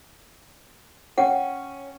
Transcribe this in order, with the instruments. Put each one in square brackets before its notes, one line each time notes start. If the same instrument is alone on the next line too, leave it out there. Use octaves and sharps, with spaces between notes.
[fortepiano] C#4 [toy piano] F#5 G5